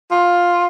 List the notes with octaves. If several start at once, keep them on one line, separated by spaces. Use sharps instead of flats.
F4